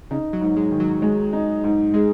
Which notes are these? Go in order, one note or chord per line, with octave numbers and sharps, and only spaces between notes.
C#3 D#4
F#3
G#2
G#3
D#3
F#3
G#3
D#4
G#2
G#3 G#4